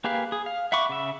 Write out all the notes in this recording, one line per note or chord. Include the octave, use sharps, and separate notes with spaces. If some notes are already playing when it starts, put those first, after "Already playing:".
A#3 G4 G#4 B4 F5
G#4
F5
E5 F#5 B5 C#6 D6
C#3 E5